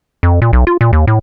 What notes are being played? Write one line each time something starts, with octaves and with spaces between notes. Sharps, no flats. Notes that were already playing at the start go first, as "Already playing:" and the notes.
F2
A#2
B1
F4
A#2
D#2
A2